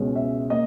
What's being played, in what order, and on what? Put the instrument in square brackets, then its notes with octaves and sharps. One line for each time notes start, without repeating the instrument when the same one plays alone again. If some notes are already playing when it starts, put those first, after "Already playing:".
Already playing: [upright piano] C#2 B2 G#3 C#4
E5
A#3 D#5